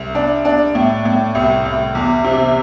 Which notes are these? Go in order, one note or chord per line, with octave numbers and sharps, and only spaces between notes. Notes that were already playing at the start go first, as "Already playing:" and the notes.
Already playing: C2
D4
D4
A2
A2
C2
C2
E2
C3